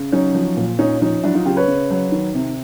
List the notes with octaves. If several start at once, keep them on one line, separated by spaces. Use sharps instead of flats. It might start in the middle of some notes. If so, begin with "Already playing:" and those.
Already playing: C#3
F#3 C#4 D#4
F3
A#2
A#2 C#4 D#4
F3 C#4 D#4
F#3 D4 E4
D#4 F4
C#3 F4 G4
B4 C#5
C#3
F#3
D#3
C3